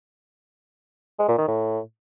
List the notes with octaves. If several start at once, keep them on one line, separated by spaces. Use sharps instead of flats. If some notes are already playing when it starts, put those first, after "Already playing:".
G#3
A#2
D#3
A2